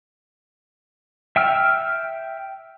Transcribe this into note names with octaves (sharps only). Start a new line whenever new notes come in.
E5 G5 E6 F6